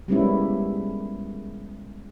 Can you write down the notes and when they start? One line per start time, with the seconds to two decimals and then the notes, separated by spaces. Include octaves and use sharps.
0.08 G3 G#3 A#3 B3 C#4 E4